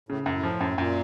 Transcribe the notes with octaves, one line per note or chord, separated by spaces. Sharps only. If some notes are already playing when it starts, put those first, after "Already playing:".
A2 C#3
G#2
F#2
A2
F3
F#2
F#2 A#2